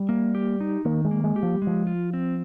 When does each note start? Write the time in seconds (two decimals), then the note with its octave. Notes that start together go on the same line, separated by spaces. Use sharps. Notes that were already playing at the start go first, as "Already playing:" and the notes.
Already playing: G3
0.09 A#3
0.35 G4
0.61 D#4
0.85 D#3 A#3
1.05 G#3
1.11 A#3
1.24 G#3
1.36 G4
1.43 F3
1.55 G3
1.62 G#3
1.67 F3
1.87 F4
2.13 C4